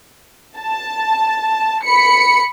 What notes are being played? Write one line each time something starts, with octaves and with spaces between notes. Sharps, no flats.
A5
B5 C#7